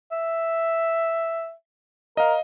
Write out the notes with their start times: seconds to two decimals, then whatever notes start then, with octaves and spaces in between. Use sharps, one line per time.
0.12 E5
2.17 A#4 D#5 F5